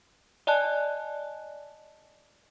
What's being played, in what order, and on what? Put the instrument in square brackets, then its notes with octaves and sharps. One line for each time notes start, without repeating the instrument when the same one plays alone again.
[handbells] D5 D#5 G#5 A5 F#6